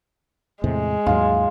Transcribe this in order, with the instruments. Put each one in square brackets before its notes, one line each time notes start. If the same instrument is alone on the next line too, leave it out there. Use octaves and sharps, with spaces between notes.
[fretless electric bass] E2 A2 C3 [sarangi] G#3
[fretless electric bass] D#2 G#2 F#3 [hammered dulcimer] F4